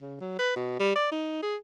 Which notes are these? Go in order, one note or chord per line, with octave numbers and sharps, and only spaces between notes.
C#3
F#3
B4
B2
G3
D5
D#4
G#4